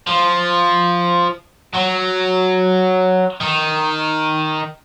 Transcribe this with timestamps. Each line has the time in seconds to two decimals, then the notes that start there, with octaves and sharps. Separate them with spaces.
0.07 F3
1.74 F#3
3.40 D#3